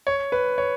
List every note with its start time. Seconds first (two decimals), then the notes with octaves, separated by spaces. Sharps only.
0.07 C#5
0.32 B4
0.58 C#5